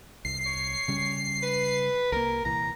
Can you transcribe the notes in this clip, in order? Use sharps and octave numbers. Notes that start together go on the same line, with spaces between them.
C2 C7
C#5
C#3 G3 C#4
B4
C2 G3 A#3 A#4
C2 A#2 E3 A#5